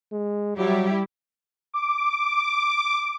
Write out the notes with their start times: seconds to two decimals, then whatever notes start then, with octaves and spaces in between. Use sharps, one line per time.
0.12 G#3
0.57 F#3 G3 E4 G4
1.73 D6
2.43 D6